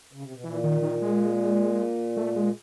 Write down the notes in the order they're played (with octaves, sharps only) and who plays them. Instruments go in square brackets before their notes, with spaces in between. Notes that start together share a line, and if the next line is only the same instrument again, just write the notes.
[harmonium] C#3
C3
B2
[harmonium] A#2 [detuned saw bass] E3
[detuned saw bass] D#3
D#3
G#3
A3
G#3